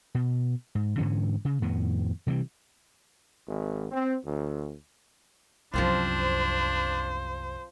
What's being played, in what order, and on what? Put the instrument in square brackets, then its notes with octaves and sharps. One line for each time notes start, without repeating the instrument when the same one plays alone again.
[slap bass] B2
G#2
G#2 D3 E3 C#4
C#3
F2 A2 D#3 B3
C3 E3 F#3 G3
[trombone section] G#1
C4
D2
[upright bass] C2 F#2 [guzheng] F3 C4 F4 [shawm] D4 [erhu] C5